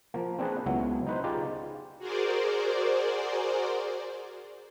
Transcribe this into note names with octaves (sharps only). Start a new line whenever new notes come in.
F3 A#3
C4 D4 G#4 B4
C#2 F#3 B3 E4
D#4 B4 C5
D#4 F4 G4 G#4 D5
F#4 G#4 A#4 C5 D5